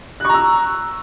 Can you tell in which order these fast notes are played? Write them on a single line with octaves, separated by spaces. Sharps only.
F#6 C#6 A#5 E6